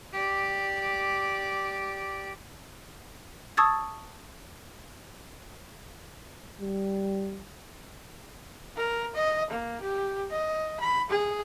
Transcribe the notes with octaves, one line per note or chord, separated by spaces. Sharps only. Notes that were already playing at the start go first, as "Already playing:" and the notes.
G4 D5
A5 C#6 D#6 E6 G#6 A6
G3
A#4
D#5
A#3
G4
D#5
B5
G#4